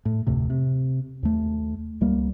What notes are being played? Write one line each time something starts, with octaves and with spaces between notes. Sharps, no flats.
A2
F1 D2 A2 C3
C3
D#2 A3
C#2 G3 A#3